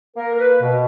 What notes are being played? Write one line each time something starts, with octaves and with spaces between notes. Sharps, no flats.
A#3 A#4
A#4
B4
B2